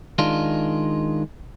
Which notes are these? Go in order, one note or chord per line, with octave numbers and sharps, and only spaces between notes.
D#3 G#3 D4 F4